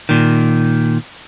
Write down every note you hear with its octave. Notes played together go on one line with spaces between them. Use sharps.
A#2 D#3